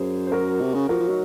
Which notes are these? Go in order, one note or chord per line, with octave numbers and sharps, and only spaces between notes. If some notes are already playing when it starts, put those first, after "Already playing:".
Already playing: F#2 G#4 C5
C5
F#4 A#4
C3
C#3
F3 F#4 A#4
F3
F#3 D#4 F#4